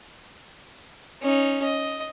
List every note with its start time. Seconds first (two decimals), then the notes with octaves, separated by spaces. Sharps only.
1.22 C#4 D#4
1.63 D#5